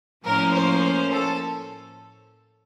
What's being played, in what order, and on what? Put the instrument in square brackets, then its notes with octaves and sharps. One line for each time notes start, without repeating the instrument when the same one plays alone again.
[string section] A2 F3 A#3 C#4 A#4
C5
A4